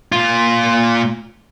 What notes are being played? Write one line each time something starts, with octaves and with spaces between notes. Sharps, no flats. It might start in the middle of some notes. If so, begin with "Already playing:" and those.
A#2 F4